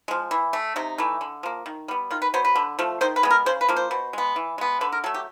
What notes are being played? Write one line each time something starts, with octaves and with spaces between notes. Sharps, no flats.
F3 G#3
E3
A3
C3 D#4
E3 A3
D3
F3 A#3
D#3
G3 B3
D#3 F4
B4
F#3 B3 C5
B4
D3
F3 A3
D#3 C5
B4
G#3 B3
A#4
C#3 C5
B4
F3 A#3
C5
B2
G#3 B3
E3
G#3 B3
D3 B4
A#4
F#3 A3 A4
G4